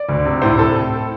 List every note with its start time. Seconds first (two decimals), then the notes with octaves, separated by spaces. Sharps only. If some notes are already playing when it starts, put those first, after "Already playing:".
Already playing: D5
0.09 D2
0.26 C3
0.42 A2 C5
0.59 A4